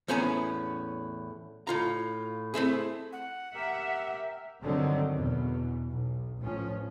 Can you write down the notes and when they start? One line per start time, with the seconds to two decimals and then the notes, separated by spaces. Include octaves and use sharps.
0.08 E2 A2 B3 C#4 G#5 A#5
1.67 A2 F4 A#5
2.54 A3 C4 E4 G#4
3.12 F#5
3.55 G4 A#4 E5
4.63 G2 D3 D#3 F#3 C4
5.14 E2 B2
5.89 B1
6.39 A1 F3 C#4